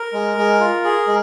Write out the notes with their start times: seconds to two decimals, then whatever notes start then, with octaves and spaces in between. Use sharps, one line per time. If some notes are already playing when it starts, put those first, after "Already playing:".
Already playing: A#4
0.13 G#3
0.37 G#3
0.60 F4
0.84 G#4
1.07 G#3